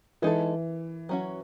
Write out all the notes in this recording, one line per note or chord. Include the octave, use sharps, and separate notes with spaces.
E3 G#3 D#4 A4
F#3 C#4 F#4